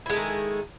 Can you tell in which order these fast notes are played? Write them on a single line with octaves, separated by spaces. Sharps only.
E4 G#3 A3 D#3